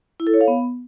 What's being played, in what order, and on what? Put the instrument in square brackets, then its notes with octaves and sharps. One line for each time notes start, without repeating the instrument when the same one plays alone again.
[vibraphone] E4
A4
C#5
F5
B3